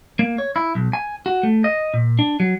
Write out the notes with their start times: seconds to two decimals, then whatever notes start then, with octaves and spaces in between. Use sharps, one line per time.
0.19 A#3
0.38 C#5
0.56 E4
0.75 B1
0.93 G#5
1.26 F#4
1.43 A3
1.64 D#5
1.94 A#2
2.19 D4
2.40 F#3